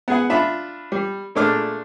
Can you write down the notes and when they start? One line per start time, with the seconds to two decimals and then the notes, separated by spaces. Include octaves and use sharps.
0.08 B3 G#4 F#5
0.30 D4 F4 E5 B5
0.92 G3
1.35 A#2 G#3 A3 D4 D6 F6